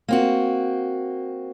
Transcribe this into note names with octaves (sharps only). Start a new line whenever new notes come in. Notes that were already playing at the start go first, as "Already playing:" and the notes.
A#3 C4 F#4